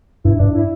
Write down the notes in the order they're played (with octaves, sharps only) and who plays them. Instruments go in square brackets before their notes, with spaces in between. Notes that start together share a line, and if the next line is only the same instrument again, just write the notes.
[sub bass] G2 [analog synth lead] E4
[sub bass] G2 [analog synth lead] D4
[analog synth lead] E4